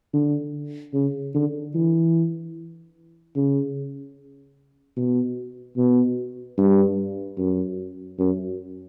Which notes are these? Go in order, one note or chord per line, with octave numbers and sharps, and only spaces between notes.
D3
C#3
D3
E3
C#3
B2
B2
G2
F#2
F#2